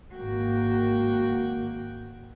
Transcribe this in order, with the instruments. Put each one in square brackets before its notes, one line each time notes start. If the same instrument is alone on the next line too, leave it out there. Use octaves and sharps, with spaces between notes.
[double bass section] G#1 A#3 [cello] F#4 G5